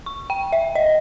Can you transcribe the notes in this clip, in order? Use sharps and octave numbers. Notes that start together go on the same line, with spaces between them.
C#6
G5
E5
D#5